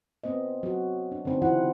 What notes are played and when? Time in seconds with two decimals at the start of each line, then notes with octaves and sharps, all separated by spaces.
0.24 B3 C4 C5 D#5
0.63 F#3 F#4
1.12 D4
1.25 D3 C4 D#4
1.42 C#3 E3 E4 F4 C5 F#5